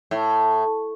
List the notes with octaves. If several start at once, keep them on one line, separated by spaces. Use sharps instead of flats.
A2